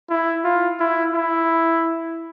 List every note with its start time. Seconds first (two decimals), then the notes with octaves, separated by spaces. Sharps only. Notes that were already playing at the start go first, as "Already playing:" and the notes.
0.10 E4
0.44 F4
0.80 E4
1.14 E4